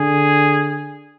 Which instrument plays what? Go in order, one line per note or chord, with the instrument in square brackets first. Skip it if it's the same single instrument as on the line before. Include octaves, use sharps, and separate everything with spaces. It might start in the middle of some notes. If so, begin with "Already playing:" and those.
Already playing: [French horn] D3 [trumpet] G#4